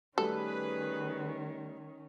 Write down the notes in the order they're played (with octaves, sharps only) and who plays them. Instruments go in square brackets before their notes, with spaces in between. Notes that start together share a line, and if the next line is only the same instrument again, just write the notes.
[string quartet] D#3 C#4 [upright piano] G3 A3 [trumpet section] G#4 B4 [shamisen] A4